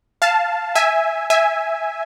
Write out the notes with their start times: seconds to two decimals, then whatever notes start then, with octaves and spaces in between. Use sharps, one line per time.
0.22 F5 A5
0.75 E5 G#5
1.30 E5 G#5